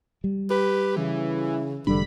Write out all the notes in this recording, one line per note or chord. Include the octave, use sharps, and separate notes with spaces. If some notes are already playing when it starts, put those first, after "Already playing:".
G3
G4 B4
C#3 E3
F1 D3 G3 D4 B5